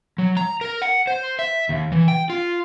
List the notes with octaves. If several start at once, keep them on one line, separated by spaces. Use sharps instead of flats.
F#3
A#5
A#4
F#5
C5
E5
D#2
E3
G5
F4